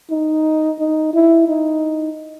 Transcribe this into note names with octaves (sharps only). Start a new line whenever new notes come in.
D#4
D#4
E4
D#4